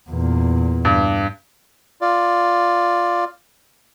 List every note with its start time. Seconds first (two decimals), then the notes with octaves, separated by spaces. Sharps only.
0.10 E2 A#2
0.85 G2
2.01 F4 D5